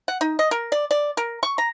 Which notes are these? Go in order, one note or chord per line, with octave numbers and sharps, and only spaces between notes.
F#5
D#4
D#5
A#4
D5
D5
A#4
C#6
A#5